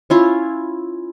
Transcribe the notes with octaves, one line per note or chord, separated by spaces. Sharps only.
C#4 E4 F4